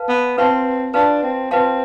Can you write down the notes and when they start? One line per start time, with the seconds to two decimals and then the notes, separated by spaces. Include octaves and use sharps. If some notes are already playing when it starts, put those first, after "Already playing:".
Already playing: B4 F5 A5
0.09 B3
0.38 C4 F4 B4 F5 A5 C6
0.94 D4 F4 B4 F5 A5 C6
1.23 C4
1.51 C4 F4 B4 F5 A5 C6